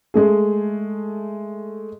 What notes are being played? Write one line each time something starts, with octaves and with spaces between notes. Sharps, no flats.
G#3 A3 G#4